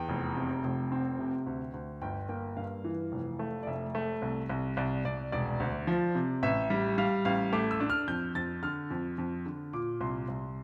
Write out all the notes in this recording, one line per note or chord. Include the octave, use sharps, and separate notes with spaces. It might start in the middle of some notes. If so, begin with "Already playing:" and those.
Already playing: E2 G5
F1
C3
F1
C4
C3
D2
D2
G1 G5
A#3 G5
G2 F5
E3
F1
A3
D5
F1 E5
A3
C2
C2
C2 D5
C2 D5
E1 D5
D2
F3
C3
A1 E5
G3
G3 F5
A1 F5
A3 D6
E6
D4
F6
F2 G6
F2 A6
D3 F6
F2
F2
D3
A#2 D6
C2 C6
C2